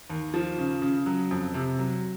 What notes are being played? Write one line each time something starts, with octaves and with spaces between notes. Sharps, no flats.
D#2
F3
C#3
C#3
F#3
F2
C3
F#3